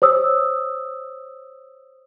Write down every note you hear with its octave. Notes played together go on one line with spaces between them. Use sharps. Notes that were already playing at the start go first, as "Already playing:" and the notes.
C5 C#5 D#6 E6